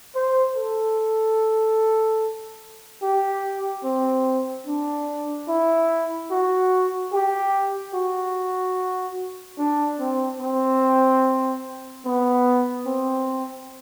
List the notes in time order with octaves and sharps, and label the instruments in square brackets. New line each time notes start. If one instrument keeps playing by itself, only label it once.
[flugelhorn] C5
A4
G4
C4
D4
E4
F#4
G4
F#4
D4
C4
C4
B3
C4